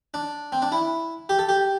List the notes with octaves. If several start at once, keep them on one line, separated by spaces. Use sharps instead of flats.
D4
C4
D4
E4
G4
A4
G4